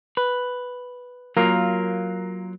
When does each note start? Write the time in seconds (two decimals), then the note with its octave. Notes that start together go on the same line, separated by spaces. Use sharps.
0.17 B4
1.37 F#3 A#3 F4 A#4